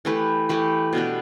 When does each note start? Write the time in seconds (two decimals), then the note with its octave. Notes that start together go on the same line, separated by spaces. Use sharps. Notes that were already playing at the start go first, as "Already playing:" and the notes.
0.05 E3 A3 G4 B4
0.49 E3 A3 G4 B4
0.93 B2 B3 D4 G4